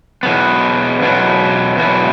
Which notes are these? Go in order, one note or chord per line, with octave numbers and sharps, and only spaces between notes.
E2 B2 F#3 B3
E2 B2 F#3 B3
E2 B2 F#3 B3